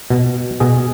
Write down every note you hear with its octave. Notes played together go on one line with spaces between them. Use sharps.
B2
B2 G#4